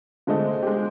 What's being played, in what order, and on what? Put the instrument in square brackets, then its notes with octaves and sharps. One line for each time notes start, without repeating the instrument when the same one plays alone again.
[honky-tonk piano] D3 G#3 A3 [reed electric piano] F4 C5 D#5
[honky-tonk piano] G#3 G4